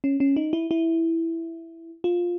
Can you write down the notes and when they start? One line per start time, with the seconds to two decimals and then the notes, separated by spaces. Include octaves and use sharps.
0.04 C#4
0.20 C#4
0.36 D#4
0.53 E4
0.71 E4
2.04 F4